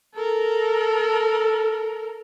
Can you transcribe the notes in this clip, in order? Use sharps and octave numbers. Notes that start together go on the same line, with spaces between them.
A4 A#4